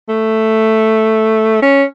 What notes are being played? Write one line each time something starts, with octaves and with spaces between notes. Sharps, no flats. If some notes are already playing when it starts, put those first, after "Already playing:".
A3
C#4